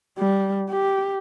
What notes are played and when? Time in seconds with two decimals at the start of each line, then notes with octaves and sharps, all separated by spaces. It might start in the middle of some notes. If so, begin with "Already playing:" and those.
0.18 G3
0.70 G4